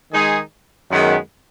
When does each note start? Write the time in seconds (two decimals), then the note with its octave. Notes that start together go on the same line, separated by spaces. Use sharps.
0.11 D#3 G#3 D#4 G#4
0.90 F#2 D#3 G#3 B3 G#4